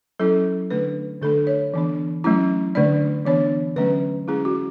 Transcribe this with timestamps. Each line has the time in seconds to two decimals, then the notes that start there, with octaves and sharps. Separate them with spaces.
0.20 F#3 C#4 E4 A4
0.71 D3 A3 D4 B4
1.22 D3 A3 D4 A4
1.47 C#5
1.74 E3 B3 D4
2.24 F#3 A3 C#4 E4
2.75 D3 A3 D4 D5
3.25 E3 B3 D4 C#5
3.76 D3 F#3 A3 C#4 B4
4.28 G#3 C#4 E4 G#4
4.45 F#4